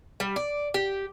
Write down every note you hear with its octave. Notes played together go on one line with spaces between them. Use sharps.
G3
D5
G4